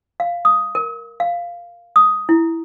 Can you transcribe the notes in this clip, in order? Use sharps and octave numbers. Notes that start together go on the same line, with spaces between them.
F5
D#6
A#4
F5
D#6
E4